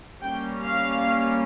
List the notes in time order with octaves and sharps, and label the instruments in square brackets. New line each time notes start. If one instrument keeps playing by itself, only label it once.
[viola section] G3 A#3 C#4 G5
F5